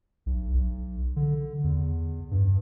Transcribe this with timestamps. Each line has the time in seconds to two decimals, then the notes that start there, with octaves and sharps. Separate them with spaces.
0.26 B1
0.54 B1
1.16 D3
1.64 E2
2.31 G2